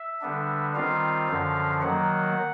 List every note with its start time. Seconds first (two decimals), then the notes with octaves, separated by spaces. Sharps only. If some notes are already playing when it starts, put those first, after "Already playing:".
Already playing: E5
0.21 D3 G3 B3 D4
0.75 D#3 G3 C4 F4 F5
1.28 F#2 D3 F3
1.82 D#3 F#3 A#3 F#5